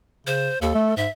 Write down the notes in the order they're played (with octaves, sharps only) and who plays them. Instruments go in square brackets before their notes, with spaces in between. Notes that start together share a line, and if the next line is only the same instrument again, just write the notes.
[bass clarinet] C#3 [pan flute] C5
[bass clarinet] D#2 [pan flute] A4
[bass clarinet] A3
[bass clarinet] G#2 [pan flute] E5